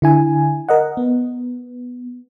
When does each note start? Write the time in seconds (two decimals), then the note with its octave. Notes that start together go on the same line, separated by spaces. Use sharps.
0.02 D3 E4 G#5
0.69 A#4 D#5 F#5
0.97 B3